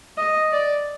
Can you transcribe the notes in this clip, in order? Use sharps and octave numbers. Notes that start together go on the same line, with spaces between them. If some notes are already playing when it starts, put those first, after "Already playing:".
D#5
D5